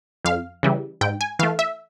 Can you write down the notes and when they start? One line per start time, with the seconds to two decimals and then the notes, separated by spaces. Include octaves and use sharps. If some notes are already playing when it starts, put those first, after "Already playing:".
0.25 F2 F5
0.63 C#3 E3 G3
1.01 G#2 G5
1.21 G#5
1.39 E3 A3 F5
1.59 E5